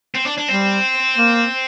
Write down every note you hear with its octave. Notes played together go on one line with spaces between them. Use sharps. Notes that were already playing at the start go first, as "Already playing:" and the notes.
C4
D4
D4
G3 C4
A#3